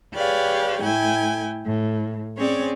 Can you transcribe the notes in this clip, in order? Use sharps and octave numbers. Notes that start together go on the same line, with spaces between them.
G4 G#4 B4 C#5 D5 F5
A2 A3 E4 G5 G#5
A2
C4 C#4 G#4 C#5 D5